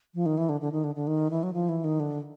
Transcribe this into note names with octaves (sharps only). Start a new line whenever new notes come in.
F3
D#3
E3
D3
D3
D#3
D3
D3
D#3
E3
F#3
F3
E3
D#3
D3